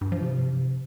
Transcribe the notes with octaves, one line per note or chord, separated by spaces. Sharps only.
G2
F3
C3